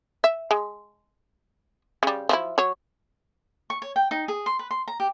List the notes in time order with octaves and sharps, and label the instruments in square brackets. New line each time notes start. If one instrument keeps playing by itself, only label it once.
[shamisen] E5
G#3
C#3 G3
F3 F#3 E4
F#3 F#4 C#5
[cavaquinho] C#6
C#5
G5
D#4
G#4
C6
B4
C6
A#5
G4